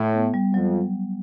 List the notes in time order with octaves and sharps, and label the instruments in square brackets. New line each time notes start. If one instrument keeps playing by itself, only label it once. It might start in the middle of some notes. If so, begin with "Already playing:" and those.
Already playing: [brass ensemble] A2
[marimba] B3
G3
[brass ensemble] F2 [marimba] F#3